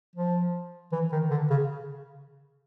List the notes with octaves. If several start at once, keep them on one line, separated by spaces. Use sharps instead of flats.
F3
E3
D#3
D3
C#3